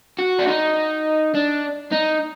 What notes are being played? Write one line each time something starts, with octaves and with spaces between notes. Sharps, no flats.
F#4
D4
D#4
D4
D#4